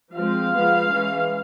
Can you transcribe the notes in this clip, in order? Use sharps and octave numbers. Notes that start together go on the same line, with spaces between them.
F3 G#3 C4 F5
F3 G#3 B3
E3 G#3 C#4